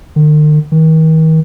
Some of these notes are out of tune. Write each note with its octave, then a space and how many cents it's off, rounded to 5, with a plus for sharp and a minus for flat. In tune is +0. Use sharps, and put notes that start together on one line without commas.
D#3 -45
D#3 +40